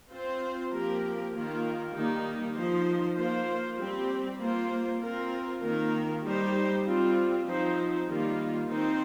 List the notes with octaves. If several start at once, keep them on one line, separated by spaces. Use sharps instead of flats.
C4 F4 C5
F3 A#3 G4 A#4
D#3 A#3 F4 A#4
D#3 G3 A#3 D#4 G4
F3 D#4 C5
A#3 F4 C5
G3 C4 G4
A#3 F4 C5
C4 F4 A#4
D#3 A#3 F4 A#4
G3 D#4 G4 C5
G3 C4 F4
F3 C4 D#4 C5
D#3 G3 A#3 F4
D#3 C4 D#4 C5